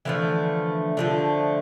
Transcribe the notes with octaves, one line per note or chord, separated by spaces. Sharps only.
D3 E3 F3 A3 E4
D3 F3 A3